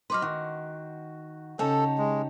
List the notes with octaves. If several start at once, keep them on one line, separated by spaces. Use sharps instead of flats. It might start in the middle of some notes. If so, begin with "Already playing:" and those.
F#3 D#4 B4 C6 D6 F6
D#3 F#4
C#3 C#4 D#4 G4 A4 C#5 A5
G#3